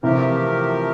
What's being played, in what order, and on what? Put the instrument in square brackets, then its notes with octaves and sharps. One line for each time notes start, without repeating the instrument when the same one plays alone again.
[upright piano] C3 E3 [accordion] F3 A3 C4 G4 A#4